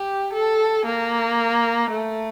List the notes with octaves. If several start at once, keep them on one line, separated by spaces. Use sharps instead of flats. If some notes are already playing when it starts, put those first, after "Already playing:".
Already playing: G4
A4
A#3
A3